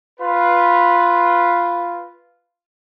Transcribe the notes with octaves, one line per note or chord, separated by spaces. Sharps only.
F4 B4